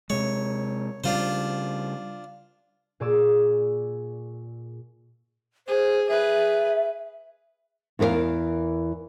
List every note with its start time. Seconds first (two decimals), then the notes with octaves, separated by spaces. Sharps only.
0.10 C3 G#3 C#5
1.04 C#3 G3 D4 F4 C5
3.00 A#2 G#4 D5 C#6 E6
5.68 G#4 C5
6.09 G#4 B4 E5
7.99 E2 E3 A#4 D5 F5